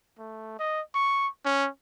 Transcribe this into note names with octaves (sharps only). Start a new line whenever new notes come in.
A3
D#5
C#6
C#4